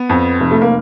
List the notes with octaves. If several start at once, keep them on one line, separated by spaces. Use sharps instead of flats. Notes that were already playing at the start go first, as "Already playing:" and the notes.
Already playing: B3
F2
F1
A3
A#3